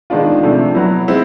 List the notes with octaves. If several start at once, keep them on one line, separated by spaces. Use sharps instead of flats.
D#3 G#3 B3 D4 F4
C3 F3 A3 D4
F#3 B3 E4
G#3 C4 E4